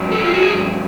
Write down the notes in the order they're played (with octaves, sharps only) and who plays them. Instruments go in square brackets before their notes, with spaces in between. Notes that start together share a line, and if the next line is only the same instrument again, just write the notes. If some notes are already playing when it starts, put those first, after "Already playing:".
Already playing: [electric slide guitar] G#2 F#3 C#4
A4
F4
F#4
G#4